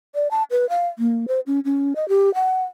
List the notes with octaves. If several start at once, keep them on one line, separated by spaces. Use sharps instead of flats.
D5
A5
B4
F5
A#3
C5
C#4
C#4
D#5
G4
F#5